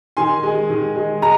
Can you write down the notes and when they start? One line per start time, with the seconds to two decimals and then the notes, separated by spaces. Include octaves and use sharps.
0.17 D#3 G#5 C6
0.43 G#3
0.70 D#3
0.96 G#3
1.22 G#3 A#5